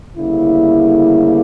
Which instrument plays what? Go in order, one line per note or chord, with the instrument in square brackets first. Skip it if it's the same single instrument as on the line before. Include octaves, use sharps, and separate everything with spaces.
[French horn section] D2 C#3 G3 A#3 E4